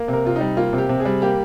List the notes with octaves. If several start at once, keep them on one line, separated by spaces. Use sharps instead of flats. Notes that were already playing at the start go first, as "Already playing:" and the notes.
Already playing: A#3
C3
A#4
C3 F4
G3 D#4
A#3 F4
C3
G4
C3
G#4
G3
A#3 G4